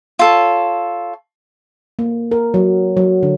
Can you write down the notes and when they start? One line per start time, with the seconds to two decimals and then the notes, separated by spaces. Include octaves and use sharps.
0.19 F4 A4 C#5
1.99 A#3
2.31 A#4
2.54 F#3
2.97 F#3
3.23 D3